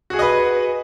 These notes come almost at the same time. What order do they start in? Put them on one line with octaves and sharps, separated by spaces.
F#4 G#4 F#5 D#5 B4